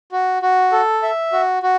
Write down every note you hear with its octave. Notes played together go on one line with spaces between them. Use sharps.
F#4
F#4
A4
E5
F#4
F#4